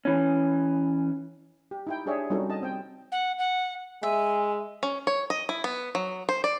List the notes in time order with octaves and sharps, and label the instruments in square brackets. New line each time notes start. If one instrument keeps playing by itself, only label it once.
[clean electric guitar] E3 C#4
[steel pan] G4
D#4 E4 G5
D4 G4 G#4 C#5 D5 E5
G3 C4 C#4 D#4 F#4 A4
D#5 A5
C4 G5
[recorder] F#5
F#5
[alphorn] G#3 [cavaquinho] E5 [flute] G#5
[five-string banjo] C#4
C#5
D#5
E4
B3
F#3
C5
D5